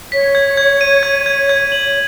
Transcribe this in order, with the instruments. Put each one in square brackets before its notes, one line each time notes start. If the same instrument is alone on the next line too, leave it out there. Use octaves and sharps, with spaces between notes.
[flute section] C#5 [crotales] B6
[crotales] G#6
G#6
D#7
G#6
G#6
G#6
F#7